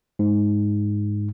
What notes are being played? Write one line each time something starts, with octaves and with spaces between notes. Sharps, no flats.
G#2